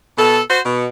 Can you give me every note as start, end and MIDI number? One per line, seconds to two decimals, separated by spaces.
0.18 0.40 47
0.18 0.40 69
0.49 0.59 66
0.49 0.59 72
0.65 0.87 47